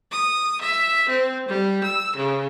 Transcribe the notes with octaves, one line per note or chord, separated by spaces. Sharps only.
D#6
E5
C4
G3
E6
C#3